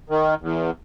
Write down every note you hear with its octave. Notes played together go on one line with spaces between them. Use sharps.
D#3
E2